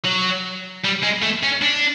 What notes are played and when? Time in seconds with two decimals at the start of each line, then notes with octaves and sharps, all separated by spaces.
0.05 F#3
0.84 G3
1.03 G#3
1.23 A3
1.43 C#4
1.62 D4